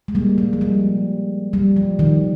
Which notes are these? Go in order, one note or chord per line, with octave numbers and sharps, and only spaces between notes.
G#3
G3 A#3
G#3
F3
G3
G3
F3
D#3